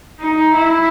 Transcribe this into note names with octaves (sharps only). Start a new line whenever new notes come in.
D#4
E4